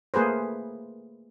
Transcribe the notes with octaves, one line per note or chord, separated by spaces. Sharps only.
A3 A#3 G#4 B4 C5